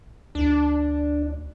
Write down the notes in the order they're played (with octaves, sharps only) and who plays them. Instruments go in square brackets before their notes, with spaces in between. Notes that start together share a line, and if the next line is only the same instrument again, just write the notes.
[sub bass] D2 [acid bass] D4